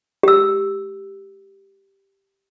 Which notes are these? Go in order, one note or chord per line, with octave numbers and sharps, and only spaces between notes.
G4 E6